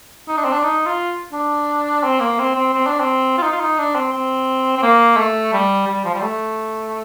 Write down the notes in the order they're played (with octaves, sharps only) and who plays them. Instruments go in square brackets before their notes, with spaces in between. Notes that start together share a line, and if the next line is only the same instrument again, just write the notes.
[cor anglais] D#4
D4
C4
D4
D#4
F4
D4
C4
A#3
C4
C4
C4
D4
C4
F4
D#4
F4
D#4
D4
C4
C4
C4
A#3
A3
G3
G3
F3
G3
A3